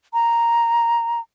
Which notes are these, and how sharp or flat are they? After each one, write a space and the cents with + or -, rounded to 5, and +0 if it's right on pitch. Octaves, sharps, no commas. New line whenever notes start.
A#5 +0